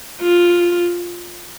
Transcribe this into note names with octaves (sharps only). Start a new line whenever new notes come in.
F4